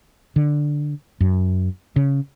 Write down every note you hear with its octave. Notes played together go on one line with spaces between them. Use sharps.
D3
F#2
C#3